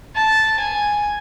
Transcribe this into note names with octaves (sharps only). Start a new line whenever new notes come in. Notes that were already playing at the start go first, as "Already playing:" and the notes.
A5
G#5